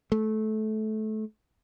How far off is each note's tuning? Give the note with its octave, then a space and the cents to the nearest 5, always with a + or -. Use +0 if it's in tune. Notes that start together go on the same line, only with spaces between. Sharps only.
A3 -20